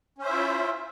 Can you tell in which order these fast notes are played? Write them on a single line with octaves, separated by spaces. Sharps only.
C#4 C5 E5 E4 F4